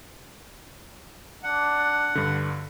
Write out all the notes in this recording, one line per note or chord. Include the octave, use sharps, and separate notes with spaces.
D4 F#5
G2 D3